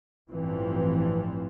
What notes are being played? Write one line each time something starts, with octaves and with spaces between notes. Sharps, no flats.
A1 G2 E3 F3 C4